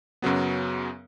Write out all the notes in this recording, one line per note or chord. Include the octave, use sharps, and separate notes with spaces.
F#2 C#3 F#3 B3